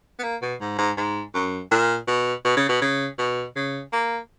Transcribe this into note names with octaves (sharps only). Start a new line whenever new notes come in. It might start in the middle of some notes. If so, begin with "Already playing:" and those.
B3
A#3
B2
G#2
G#2
G#2
F#2
A#2
B2
B2
C#3
B2
C#3
B2
C#3
A#3